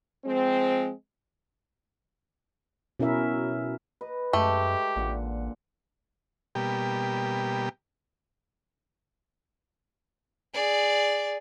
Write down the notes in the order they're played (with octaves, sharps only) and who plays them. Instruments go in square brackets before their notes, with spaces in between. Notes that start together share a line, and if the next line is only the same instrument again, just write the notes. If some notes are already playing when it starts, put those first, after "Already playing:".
[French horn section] F3 G#3 C4
[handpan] B2 C#4 E4 A#4 E5
[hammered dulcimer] B4 D#5
[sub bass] F#2 [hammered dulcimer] G#3 [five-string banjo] A3 [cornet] G4
[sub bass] A1 [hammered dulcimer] A#2 D3 F#5
[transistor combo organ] B2 G3 A#3 G4
[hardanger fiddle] G#4 D5